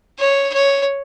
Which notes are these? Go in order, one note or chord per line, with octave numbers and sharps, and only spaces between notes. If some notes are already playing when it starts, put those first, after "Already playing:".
C#5
C#5